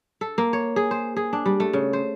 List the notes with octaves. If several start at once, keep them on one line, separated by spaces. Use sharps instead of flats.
A4
A#3
C#5
G#4
C5
G#4
D4
G3
A3
C#3
C5